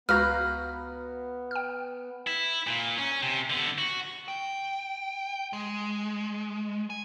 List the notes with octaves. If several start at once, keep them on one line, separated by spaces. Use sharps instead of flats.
C#2 B3 F#4 B4 F5 A#5 F6 G6
G5 F6
E4
A#2
C#4
C3
D3 B3
F#4
G5
G#3
G#5